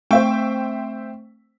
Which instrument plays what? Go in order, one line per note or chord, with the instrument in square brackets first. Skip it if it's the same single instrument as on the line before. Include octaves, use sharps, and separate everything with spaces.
[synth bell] A3 C4 C#6 [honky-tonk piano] C5 E5 G5